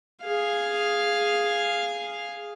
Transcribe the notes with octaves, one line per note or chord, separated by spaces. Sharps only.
G#4 F5